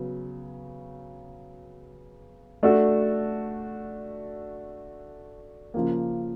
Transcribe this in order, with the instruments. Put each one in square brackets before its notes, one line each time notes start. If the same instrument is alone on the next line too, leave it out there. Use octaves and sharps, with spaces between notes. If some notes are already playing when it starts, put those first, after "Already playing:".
Already playing: [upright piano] C#3 F#3 B3
A3 D4 F#4 A4
C#3 F3 A#3